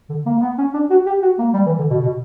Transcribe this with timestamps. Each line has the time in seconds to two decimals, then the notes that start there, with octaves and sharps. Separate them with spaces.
0.09 D3
0.26 A#3
0.38 A#3
0.42 B3
0.58 C#4
0.74 D4
0.90 F#4
1.06 G4
1.22 F#4
1.38 A#3
1.54 G3
1.66 E3
1.78 D3
1.91 B2
2.02 B2